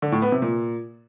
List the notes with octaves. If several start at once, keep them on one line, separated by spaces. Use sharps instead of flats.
D3
A2
B3
C3
A#2